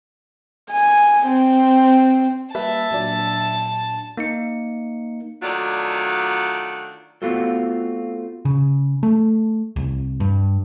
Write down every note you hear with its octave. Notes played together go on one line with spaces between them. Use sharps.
G#5
C4
G3 A#3 B4 E5 A5
A#2 F#3 D4
A#3 D#4 C#7
D#3 F#3 A3 D4 F4 D5
A3 B3 C4 F4 F#4 A4
C#3
A3
C2
G2